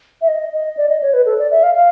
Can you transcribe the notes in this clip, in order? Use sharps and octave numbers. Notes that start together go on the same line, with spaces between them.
E5
D#5
D#5
D5
D#5
C#5
B4
A4
D5
E5
F5
F5